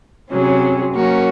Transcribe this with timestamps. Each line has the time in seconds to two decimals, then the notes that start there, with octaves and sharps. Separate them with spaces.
0.31 C3 F#3 C#4 G#4
0.93 F#3 A#3 C#4 F#4 A#4